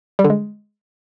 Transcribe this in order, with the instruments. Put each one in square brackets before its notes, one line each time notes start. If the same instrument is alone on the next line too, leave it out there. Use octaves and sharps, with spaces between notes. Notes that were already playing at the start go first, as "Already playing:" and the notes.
[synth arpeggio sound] G3
D3
G#3